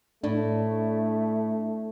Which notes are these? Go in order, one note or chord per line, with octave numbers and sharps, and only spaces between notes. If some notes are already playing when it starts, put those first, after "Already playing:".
A2 A3 D4